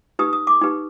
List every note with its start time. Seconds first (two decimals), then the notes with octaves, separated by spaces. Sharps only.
0.19 D#4 G4 B4 D#6
0.33 D#6
0.47 D6
0.61 D#4 G4 B4